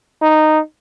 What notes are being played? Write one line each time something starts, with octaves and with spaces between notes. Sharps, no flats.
D#4